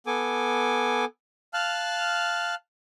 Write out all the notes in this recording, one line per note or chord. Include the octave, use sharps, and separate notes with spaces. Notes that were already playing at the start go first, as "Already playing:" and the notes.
B3 A4 G#5 D6
F5 A5 F6 F#6